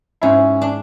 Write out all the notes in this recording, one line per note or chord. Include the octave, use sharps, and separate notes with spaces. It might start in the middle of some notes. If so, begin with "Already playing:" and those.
G#2 C#4 E4
D4